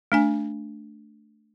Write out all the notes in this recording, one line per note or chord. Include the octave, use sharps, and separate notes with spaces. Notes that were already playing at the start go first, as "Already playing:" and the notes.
A3 D4 G#5